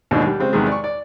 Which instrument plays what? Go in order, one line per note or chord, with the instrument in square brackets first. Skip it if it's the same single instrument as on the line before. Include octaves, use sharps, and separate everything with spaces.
[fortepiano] D#2 G#2 B2 E3 D4
G3
C#3 G#3 C4
E2 C3 D#3 G3 G#3
D5 C#6
D5